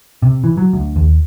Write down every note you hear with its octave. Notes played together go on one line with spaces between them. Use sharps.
C3
E3
F#3
D2
D#2